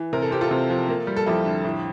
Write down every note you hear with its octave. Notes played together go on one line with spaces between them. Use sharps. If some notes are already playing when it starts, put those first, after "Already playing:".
Already playing: E3
C3 A#4
A4
C4 G4
F4 A4
C3
F3
A#3
G3
A4
F2 E4 G4
D3
A2